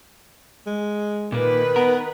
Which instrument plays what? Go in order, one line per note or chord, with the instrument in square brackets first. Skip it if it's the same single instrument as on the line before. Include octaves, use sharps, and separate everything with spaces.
[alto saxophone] G#3
[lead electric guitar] A#2 A#3 [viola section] D#3 B4
[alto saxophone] B3 [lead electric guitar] A#4